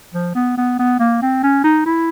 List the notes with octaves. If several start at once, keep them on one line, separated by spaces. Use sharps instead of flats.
F3
B3
B3
B3
A#3
C4
C#4
D#4
E4